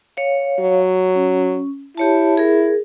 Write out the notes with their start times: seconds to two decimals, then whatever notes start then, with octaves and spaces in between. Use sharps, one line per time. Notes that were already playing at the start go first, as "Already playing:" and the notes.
0.17 C#5 F5
0.60 F#3
1.15 C#4
1.97 E4 G4 C#5 A5
2.37 G#4 A#4